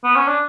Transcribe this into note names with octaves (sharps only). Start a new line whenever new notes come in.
B3
C#4
D4